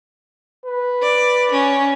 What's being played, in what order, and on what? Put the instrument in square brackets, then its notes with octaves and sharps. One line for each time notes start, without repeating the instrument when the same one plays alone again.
[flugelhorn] B4
[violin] D5
C#4